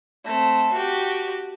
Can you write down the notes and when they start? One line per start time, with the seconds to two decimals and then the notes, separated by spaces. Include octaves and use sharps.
0.25 A3 C4
0.73 F#4 G4